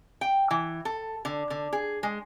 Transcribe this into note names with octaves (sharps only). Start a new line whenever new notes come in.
G5
E3
A4
D3
D3
G#4
G#3